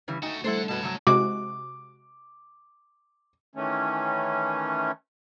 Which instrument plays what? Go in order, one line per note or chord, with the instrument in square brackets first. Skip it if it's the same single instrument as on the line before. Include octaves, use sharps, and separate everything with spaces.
[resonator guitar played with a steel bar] C#3 E3 G3
[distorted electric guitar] A3 F#4 [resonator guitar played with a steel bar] D#4 [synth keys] G5 G#5
[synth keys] G3 A3 [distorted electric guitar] D4 F#5 [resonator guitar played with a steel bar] E4 A4 C5
[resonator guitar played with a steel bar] B2 F#4 B4 [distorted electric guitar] C#5 A5
[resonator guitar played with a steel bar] C3 F#3
[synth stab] C3 G#3 F#4 [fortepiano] D6
[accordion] D#3 E3 A3 C#4